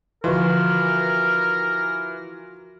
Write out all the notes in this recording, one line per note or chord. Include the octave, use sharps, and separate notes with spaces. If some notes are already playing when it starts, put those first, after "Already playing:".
D3 E3 F3 F4 F#4 A#4 C6